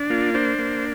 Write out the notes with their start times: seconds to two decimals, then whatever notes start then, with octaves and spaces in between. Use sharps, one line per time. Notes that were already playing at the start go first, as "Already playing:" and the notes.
Already playing: D4
0.10 A#3 F4
0.34 D4 C5
0.59 A#3